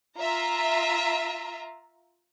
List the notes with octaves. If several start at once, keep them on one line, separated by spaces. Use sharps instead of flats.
F4 E5 A#5